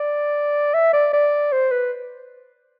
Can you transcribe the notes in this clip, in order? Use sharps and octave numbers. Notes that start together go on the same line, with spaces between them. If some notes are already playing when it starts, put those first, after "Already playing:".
Already playing: D5
E5
D5
D5
C5
B4